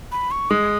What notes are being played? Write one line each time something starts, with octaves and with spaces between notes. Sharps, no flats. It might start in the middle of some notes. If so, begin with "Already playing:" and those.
B5
C#6
G#3 D#6